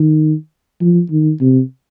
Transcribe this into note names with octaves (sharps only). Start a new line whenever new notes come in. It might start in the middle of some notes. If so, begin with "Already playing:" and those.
Already playing: D#3
F3
D#3
C3